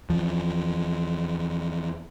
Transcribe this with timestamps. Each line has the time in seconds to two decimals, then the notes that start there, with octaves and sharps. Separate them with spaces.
0.10 E2 F3